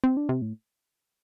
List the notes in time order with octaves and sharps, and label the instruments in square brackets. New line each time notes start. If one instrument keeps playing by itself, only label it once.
[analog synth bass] C4
D4
C3
A2